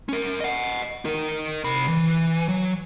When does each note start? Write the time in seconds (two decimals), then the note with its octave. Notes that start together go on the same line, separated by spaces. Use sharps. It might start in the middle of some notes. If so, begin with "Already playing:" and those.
0.09 C#4 A#4
0.41 D#5 F#5
1.05 D#4 A#4
1.64 C3 B5
1.88 E3
2.49 F#3